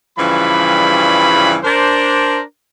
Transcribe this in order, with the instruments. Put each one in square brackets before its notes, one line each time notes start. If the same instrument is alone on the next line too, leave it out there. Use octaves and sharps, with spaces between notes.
[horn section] G2 C#3 E3 F3 G3 B5
D4 A#4 C5